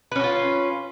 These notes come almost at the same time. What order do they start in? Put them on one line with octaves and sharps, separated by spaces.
B4 C#4 F#4 F4